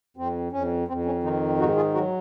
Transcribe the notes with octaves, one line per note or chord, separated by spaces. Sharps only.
F2 C4
F2 C#4
F2 C4
C#4
D#3 C4 D#4
G#2 D#4 F#4
F4 G#4
F#3 F#4 A#4